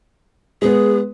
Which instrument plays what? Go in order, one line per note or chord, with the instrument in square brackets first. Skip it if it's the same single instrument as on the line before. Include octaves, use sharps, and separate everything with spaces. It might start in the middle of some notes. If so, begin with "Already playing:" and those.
[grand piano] G#3 B3 [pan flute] G#4